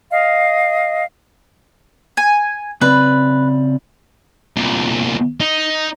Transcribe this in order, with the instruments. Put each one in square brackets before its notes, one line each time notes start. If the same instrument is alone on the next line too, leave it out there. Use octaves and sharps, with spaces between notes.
[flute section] D#5 F5
[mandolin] G#5
[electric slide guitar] C#3 C4 D5 [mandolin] B4
[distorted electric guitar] C2 A#2
D#4